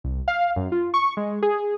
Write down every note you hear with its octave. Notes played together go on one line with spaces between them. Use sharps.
C2
F5
F#2
F4
C#6
G#3
G#4